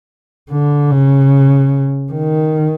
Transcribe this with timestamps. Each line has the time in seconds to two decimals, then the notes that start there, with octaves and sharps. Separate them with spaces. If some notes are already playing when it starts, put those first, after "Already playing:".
0.51 D3
0.91 C#3
2.13 D#3